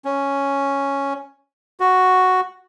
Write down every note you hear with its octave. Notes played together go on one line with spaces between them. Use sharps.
C#4
F#4